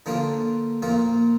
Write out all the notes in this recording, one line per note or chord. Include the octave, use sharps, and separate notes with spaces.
D3 F3 A#3 D4 F4
A#2 F3 A#3 F4